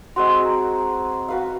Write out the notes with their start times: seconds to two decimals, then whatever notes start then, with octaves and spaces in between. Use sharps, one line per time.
0.16 G#3 C4 F#4 C6
0.45 A#5
1.28 F#4 B4 F5